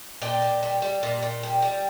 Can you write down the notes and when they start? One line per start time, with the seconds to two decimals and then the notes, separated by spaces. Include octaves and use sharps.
0.22 A#2 D5 G5
0.42 A#2
0.63 G3
0.82 G3
1.03 A#2
1.22 A#2
1.43 G3
1.62 G3